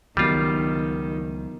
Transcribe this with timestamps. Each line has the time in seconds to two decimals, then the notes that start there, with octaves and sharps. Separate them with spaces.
0.17 C#2 D#3 F#3 G3 B3 F4